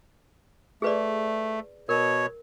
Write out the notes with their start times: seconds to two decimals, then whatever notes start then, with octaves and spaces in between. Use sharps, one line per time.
0.82 A3 G#4 B4 D5
1.89 B2 A#4 C#5